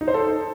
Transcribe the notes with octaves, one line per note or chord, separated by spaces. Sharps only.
D#4
C5
A4